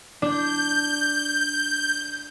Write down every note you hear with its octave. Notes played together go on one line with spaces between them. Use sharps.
D4 G6